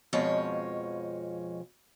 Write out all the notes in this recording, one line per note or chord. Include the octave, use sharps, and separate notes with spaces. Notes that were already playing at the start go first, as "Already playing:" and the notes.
F2 B2 F3 G#3 C#5